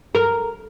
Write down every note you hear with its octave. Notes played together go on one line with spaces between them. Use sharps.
A#4